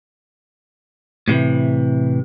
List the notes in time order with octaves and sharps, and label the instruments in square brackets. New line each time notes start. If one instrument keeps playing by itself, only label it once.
[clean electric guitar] A2 C3 E3